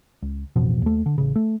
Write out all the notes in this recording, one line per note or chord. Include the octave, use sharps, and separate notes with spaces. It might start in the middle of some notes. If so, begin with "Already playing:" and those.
C#2
A1 F2 B2 F3
D#2 A3
D3
A1 C#3
A3